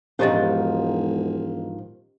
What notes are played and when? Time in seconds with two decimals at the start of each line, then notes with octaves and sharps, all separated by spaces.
0.19 E1 G#2 D#3 F3 C#4 G4 D#5